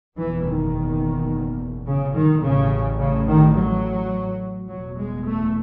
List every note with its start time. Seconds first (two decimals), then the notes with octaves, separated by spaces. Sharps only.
0.17 F#1 E2 B2 E3
0.45 D#3
1.86 C#3
2.15 D#3
2.43 A1 A2 C#3
2.99 C#3
3.27 D#3
3.56 F#3
4.69 F#1 E2 B2 F#3
4.97 G#3
5.25 A3